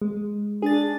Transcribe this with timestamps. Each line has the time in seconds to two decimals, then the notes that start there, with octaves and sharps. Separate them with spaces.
0.01 G#3
0.62 D4 G#4 A6